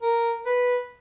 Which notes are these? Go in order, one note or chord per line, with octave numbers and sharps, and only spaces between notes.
A#4
B4